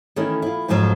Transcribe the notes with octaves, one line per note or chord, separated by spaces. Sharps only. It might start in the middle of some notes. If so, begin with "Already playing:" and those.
D#3 E3 A3 C#4 E4 A#4
E4 F4
F2 G#2 C#3 F3 F#3